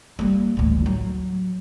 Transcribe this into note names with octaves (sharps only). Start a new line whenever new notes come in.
G3 A#3
A1 D2
F#3